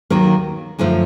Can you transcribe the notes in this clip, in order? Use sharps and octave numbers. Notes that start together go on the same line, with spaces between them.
D#2 D#3 F#3 A#3
F#2 D3 F3 A3